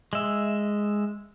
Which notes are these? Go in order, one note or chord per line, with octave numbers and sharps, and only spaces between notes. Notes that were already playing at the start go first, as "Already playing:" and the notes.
G#3 E5